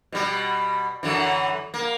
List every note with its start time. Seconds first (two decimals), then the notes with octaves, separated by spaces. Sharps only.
0.12 B2 G3
1.03 F#2 D3 E3
1.74 A#3